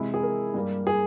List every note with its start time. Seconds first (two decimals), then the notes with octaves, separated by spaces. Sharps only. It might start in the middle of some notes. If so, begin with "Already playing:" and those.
Already playing: C3 E3 G#3 E4
0.14 G#4
0.23 A#4
0.54 G2 G3 A#3
0.87 G#4